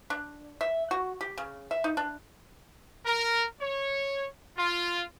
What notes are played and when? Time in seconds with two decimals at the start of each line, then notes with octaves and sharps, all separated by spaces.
0.10 D4
0.61 E5
0.91 F#4
1.21 G4
1.38 C#3
1.71 E5
1.84 D#4
1.97 D4
3.05 A#4
3.61 C#5
4.57 F4